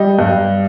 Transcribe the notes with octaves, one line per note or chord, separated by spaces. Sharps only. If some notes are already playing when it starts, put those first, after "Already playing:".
Already playing: G3 D#5
G2